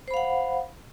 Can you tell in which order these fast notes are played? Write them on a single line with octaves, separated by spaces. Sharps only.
C5 B5 F5 F#5